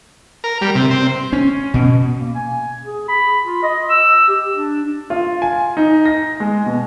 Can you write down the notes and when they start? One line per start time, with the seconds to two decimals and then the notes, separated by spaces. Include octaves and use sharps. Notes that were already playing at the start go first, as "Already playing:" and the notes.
0.44 A#4
0.61 G3
0.75 C3
0.91 C4
1.33 C#4
1.74 B2
2.19 A#3
2.35 G#5
2.85 G#4
3.08 B5
3.45 F4
3.62 D#5
3.90 E6
4.28 G4
4.55 D4
5.10 F4
5.42 G#5
5.77 D#4
6.06 A#6
6.40 G#3
6.66 B2